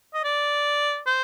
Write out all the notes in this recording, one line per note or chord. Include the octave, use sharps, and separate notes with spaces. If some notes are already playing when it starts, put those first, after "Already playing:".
D#5
D5
C5